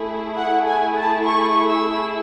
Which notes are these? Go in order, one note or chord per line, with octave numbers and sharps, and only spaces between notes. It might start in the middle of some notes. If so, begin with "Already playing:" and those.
Already playing: A3 E4 G#4
F#5
G#5
A5
C#6
E6